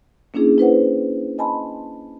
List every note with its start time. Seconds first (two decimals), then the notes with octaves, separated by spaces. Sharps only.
0.34 A#3 C#4 D4 E4 G#4
0.58 E4 B4 C5 F#5
1.38 D#5 G#5 A5 B5 C6